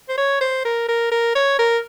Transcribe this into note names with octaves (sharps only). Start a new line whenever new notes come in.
C5
C#5
C5
A#4
A#4
A#4
C#5
A#4